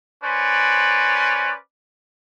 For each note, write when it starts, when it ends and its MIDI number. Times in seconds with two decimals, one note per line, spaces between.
0.24 1.55 61
0.24 1.55 71
0.24 1.55 72
0.24 1.55 74